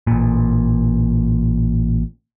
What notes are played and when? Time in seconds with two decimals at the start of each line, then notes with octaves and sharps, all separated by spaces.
0.07 A1 A#2